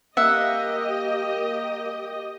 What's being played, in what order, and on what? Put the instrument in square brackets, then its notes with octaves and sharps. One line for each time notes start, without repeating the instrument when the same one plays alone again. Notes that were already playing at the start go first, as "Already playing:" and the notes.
[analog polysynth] A#3 [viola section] G4 D#5 [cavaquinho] E5 F#5